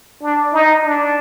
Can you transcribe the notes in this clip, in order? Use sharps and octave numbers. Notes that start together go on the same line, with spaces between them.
D4
D#4
D4